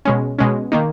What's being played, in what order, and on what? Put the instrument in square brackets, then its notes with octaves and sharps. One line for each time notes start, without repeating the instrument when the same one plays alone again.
[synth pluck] B2 G#3 C#4
B2 G#3 C#4
D#3 A#3 D#4